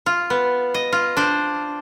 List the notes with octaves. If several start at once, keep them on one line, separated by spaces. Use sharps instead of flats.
F4
B3
D#5
F4
D4 C5